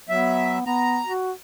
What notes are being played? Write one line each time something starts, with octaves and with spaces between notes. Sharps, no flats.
F#3 B3 E5
B3 A#5
F#4